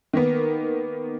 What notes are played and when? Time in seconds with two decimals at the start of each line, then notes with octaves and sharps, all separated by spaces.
0.13 D#3 A#3 B3